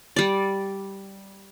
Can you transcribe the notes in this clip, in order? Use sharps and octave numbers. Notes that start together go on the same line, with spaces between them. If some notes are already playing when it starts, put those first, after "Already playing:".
G3 D5